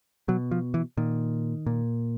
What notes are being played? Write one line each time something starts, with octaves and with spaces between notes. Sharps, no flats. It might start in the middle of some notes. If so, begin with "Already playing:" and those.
B2 F#3
F3
E3
A#2 D#3
A#2